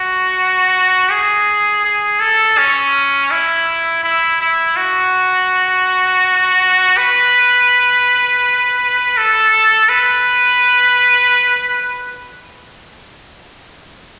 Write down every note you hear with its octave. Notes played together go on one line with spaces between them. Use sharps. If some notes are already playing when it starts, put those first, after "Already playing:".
Already playing: F#4
G#4
G#4
A4
C#4
E4
E4
E4
F#4
B4
A4
B4